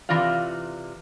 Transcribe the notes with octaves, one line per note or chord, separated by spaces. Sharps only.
C3 E3 F4 D5 F5